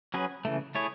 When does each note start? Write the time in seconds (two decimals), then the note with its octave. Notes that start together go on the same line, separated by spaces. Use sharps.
0.14 F#3 C#4 G#4 B4
0.45 C#3 E3 A3
0.75 A3 E4 G#4 C#5